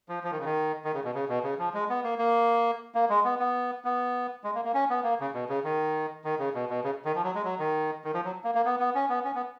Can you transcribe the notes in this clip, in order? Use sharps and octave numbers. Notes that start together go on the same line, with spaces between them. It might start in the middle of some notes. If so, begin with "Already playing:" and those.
F3
F3
D#3
C#3
D#3
D#3
C#3
B2
C#3
B2
C#3
F3
G#3
B3
A#3
A#3
A#3
G#3
B3
B3
B3
G#3
A#3
A#3
C#4
B3
A#3
C#3
B2
C#3
D#3
D#3
C#3
B2
B2
C#3
D#3
F3
F#3
G#3
F#3
D#3
D#3
F3
F#3
A#3
A#3
B3
B3
C#4
B3
C#4
B3